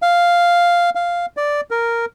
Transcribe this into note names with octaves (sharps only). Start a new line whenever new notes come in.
F5
F5
D5
A#4